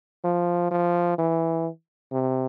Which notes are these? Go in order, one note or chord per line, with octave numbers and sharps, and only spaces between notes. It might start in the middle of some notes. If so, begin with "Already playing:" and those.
F3
F3
E3
C3